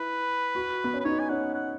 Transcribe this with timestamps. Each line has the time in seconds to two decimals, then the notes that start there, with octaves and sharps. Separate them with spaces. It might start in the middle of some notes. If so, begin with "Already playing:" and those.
Already playing: E4 B4
0.55 F#4
0.84 B3
0.94 C#4
1.01 B4
1.05 D#4 C#5
1.20 G#5
1.29 C#4 F#5
1.55 F#5